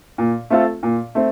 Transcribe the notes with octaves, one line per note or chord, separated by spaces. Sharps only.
A#2
A3 C4 F4 A4
A#2
A3 C4